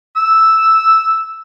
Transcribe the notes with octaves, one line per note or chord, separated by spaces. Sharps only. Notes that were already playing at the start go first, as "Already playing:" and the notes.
E6